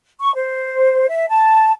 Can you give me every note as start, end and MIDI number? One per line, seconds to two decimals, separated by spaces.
0.21 0.34 85
0.35 1.06 72
1.08 1.27 76
1.28 1.71 81